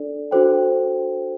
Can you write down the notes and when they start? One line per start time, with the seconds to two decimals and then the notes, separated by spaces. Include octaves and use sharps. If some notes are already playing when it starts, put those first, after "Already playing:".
Already playing: D4 A4 D5
0.31 D4 F#4 A4 C5 G5